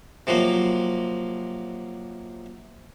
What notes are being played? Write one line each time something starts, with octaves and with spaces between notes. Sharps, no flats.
C3 F3 F#3 A#3